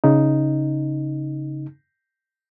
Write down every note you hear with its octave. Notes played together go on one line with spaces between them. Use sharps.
C#3 D#4